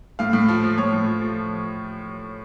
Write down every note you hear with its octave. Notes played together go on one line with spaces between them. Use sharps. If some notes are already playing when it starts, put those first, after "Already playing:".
A2 F5
A2
F3
F3
A2 C#5
A2
F3
F3